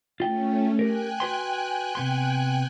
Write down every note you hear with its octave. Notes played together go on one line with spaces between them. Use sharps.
A3 C#4 F4 G5
G4 A#4 G5 G#5 F#6
F#4 B4 C6
C3 B3 C6